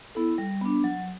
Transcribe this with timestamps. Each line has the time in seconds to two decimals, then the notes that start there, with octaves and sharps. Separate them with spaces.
0.15 B3 E4 A4
0.38 G3
0.61 B3 D4
0.84 F#3